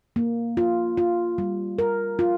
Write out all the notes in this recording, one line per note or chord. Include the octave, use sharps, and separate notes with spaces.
A#3
F4
F4
G3
A#4
F4